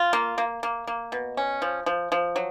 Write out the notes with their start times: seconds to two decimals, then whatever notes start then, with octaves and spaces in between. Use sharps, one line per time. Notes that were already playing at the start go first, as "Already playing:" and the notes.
Already playing: F4
0.13 A#3
0.38 A#3
0.63 A#3
0.87 A#3
1.12 B2
1.37 C#4
1.62 F3
1.86 F3
2.12 F3
2.36 F#3